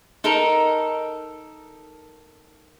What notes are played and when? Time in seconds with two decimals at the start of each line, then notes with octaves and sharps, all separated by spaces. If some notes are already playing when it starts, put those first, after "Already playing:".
0.24 D#4 A4 A#4